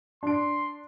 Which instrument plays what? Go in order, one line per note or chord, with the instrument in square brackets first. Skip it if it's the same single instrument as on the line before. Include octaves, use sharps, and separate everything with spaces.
[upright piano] D4 D7 [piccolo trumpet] C6